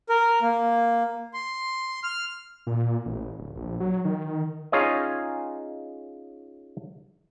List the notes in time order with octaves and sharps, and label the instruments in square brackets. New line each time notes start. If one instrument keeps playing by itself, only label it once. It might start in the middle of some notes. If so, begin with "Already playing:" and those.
[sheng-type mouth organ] A#4
A#3
C6
F6
[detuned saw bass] A#2
A1
D1
A#1
F#3
D#3
[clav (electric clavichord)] C#4 D#4 F4 G#4 C#5 D#5